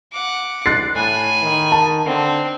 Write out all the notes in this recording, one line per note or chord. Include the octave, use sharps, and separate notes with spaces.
F#5 D6
C2 F#6 A6 C7
A2 G#5 B5
D#3
A5
D3 C4